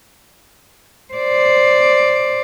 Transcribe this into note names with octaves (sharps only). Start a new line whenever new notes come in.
C5 D5